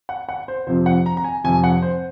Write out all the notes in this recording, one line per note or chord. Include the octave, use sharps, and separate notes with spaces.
F#5
F#5
C5
F2 C3 F3 C5
F#5
A#5
A#5
G#5
F2 C3 F3 G#5
F#5
C5